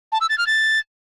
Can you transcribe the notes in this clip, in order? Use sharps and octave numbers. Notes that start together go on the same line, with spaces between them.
A5
E6
A6
F6
A6